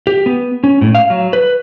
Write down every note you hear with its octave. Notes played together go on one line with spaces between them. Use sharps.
G4
B3
C#4
A2
F5
F#3
B4